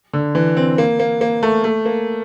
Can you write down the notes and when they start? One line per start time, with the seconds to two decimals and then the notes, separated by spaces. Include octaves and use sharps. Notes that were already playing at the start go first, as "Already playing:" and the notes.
0.13 D3
0.35 E3
0.57 C4
0.78 A#3
1.00 A#3
1.21 A#3
1.43 A3
1.64 A3
1.86 A#3